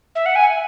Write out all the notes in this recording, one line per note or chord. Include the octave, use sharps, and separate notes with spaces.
E5
F#5
G#5